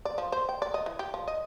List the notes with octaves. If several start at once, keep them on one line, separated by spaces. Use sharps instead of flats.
D5
F3
C5
G5
D5
D#5
E3
G4
F3
D#5